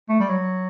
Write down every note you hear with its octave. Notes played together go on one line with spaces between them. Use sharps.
A3
G3
F#3